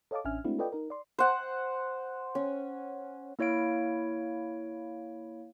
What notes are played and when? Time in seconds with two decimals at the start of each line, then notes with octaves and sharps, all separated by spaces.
0.11 A4 C#5 D#5 F5 A5 D6
0.25 A1 C#4 D4 E5 G#5 F6
0.44 G#3 A3 C4 D4 E4 F#4
0.59 F4 A4 B4 D5 D#5 G5
0.72 D#4 A#4
0.90 D5 C6
1.19 C5 F#5
2.35 C#4
3.39 A#3 E4 C#5 F5 D7